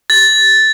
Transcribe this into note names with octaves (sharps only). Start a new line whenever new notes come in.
A6